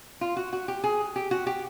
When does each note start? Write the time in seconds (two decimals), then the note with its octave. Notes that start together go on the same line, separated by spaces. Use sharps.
0.21 F4
0.37 F#4
0.53 F#4
0.68 G4
0.84 G#4
1.16 G4
1.31 F#4
1.47 G4